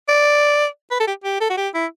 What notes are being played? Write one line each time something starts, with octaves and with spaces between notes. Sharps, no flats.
D5
B4
A4
G4
G4
A4
F#4
G4
E4